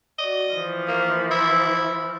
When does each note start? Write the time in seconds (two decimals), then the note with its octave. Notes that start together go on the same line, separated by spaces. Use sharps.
0.18 F#4 D5 D#5
0.50 E3 F3
0.88 A#3
1.31 E4